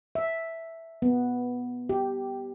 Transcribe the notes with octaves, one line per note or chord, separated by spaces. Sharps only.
E5
B3
G4